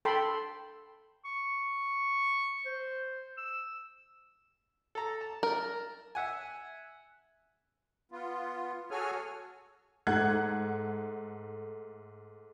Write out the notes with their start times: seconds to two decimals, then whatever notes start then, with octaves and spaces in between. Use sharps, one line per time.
0.05 A4 G5 B5 C6
1.25 C#6
2.66 C5
3.38 E6
4.95 A4 A#5
5.21 A5
5.43 A#4
6.15 E5 F#5 G#5
8.12 B3 F4
8.91 F#4 G#4 A4 C#5 G#5 F6
10.07 G#2 A3 F#5 F#6 G#6